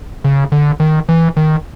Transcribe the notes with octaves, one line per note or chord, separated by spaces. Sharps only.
C#3
D3
D#3
E3
D#3